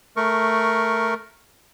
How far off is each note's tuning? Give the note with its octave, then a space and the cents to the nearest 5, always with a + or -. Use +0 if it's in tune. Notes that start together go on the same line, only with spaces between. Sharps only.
A3 +0 A#4 +0 C#6 +0